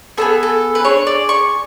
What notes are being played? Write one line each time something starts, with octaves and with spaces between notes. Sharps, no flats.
B3 D4 G#4 A4
A4
B4
D4 G#4 C#5
D5
C#6